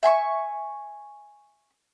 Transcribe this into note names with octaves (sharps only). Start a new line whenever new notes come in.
E5 G#5 C6 C#6